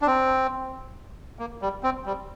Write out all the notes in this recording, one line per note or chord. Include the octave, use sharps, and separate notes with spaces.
D4
C4
A#3
G3
C4
G3